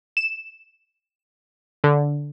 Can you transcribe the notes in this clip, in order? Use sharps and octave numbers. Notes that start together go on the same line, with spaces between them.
E7
D3